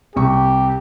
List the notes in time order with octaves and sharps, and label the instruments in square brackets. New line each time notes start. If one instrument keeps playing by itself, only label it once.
[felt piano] C2 C#6 [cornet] G4